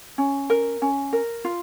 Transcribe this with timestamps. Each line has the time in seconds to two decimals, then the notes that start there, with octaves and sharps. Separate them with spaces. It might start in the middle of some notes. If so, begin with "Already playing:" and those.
0.18 C#4
0.50 A#4
0.82 C#4
1.13 A#4
1.45 F4